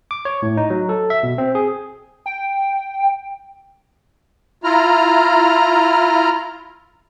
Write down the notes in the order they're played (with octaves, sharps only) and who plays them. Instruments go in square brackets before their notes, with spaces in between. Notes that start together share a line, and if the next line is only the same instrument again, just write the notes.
[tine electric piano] D6
C#5
A2
D#4
F#3
A4
E5
B2
C4
G#4
[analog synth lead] G5
[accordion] E4 F4 A#5 F6